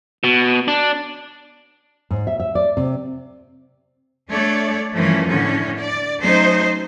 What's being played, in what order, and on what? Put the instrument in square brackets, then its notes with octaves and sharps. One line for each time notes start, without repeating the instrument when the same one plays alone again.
[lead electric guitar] B2
D4
[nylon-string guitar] G#2
E5
E5
D5
C3
[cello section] A3 D4 C#5 D5
G2 E3 F3 A3 A#3 C#4
A2 D3 C#4
D5
F#3 A3 C#4 D#4 C5